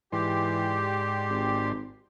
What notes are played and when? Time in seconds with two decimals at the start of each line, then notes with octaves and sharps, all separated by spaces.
0.12 G#2 E3 G4 D5 C6
1.30 G#1